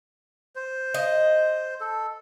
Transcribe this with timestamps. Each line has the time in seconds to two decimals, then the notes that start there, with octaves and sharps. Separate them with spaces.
0.56 C5
0.94 D#5
1.80 A4